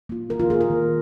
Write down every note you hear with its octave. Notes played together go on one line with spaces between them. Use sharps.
A#3 F4
D#3 A#4
F4
A#3 F4 G#4
A#4
D#3